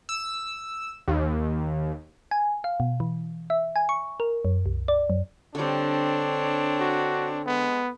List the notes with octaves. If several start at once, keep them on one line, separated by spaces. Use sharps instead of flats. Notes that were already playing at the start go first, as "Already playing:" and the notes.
E6
D#2
G#5
F5
B2
E3
E5
G#5
C#6
A#4
F#2
C2
D5
F#2
D3 G3 C4 D4 C#5
F#4
G#3 B3